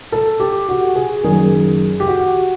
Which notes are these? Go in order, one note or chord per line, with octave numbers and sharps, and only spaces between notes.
A4
G4
F#4
G#4
F#1 F#2 D#3 G#4
G4
F#4